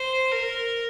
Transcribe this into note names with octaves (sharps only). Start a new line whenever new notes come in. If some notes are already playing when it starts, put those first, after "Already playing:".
Already playing: C5
A#4